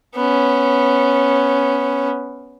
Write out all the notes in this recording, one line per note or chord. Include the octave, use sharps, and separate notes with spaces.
B3 C#4